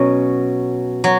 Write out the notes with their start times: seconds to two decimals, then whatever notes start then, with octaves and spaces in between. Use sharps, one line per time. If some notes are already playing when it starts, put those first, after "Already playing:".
Already playing: B2 F#3 C#4
1.04 F#3